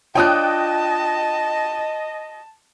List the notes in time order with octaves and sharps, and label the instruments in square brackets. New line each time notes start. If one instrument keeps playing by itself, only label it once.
[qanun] D4 F4 C#5 [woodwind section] D#5 [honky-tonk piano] G5 D#6 F#6 [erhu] A5